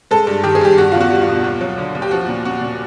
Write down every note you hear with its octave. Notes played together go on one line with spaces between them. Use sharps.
G#3 A4
G2
D#3 G4
G#4
G2 G4
G3 F#4
E2 F4
F#4
G3
F4
B2
D#2
F#3
D3
D#2
G4
F3 F#4
A#2
A#2 F#4
A#2